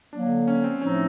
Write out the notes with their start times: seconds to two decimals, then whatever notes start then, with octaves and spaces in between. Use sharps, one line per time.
0.13 D3 F#3 A#3 D4
0.48 C#4
0.64 C4
0.81 A2 F3 A3 C4 C#4 D#4